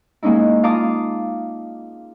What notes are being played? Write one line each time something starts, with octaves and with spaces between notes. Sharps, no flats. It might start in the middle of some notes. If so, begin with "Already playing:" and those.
G#3 A#3 C#4 D#4 E4
F4 F5 A5 A#5 D6 D#6